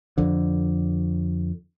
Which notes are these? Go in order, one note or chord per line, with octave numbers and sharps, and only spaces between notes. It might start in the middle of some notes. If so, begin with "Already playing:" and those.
F2 D3